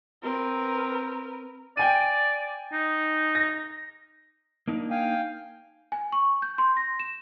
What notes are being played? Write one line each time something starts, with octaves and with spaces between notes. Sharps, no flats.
C4 A#4 B4
D5 G5 G#5 D#7
D#4
A#6
A#3 D4 D#4
F5 G5 G#5
G#5
C#6
G6
C6
A#6
E7